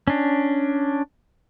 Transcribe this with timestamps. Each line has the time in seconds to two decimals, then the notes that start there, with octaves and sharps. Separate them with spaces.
0.08 C#4 D4